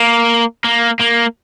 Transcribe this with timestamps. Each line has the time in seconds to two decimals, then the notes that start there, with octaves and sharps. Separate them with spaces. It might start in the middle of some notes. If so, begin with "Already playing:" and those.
Already playing: A#3
0.64 A#3
1.00 A#3